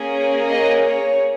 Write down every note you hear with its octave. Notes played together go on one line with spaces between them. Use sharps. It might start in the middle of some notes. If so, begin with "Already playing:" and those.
Already playing: A#3 C#4 G#4
D#5
C#5